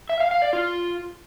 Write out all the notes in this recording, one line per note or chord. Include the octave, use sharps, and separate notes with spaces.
E5
F5
F5
D5
F4